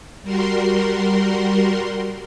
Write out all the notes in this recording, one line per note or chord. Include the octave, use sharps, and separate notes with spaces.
G3 F#4 A#4 C6